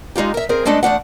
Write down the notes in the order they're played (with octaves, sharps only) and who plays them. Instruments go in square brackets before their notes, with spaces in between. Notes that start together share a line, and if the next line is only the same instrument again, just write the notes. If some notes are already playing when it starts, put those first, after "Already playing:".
[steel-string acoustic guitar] G#3 D#4 F4 G4
A#4 E5
C4 G#4 A#4
G#3 A3 B3 D4 A4 D#5
E2 A3 D4 F#5